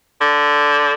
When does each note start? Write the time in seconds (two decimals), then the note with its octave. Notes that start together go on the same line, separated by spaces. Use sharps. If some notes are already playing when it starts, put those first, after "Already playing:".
0.21 D3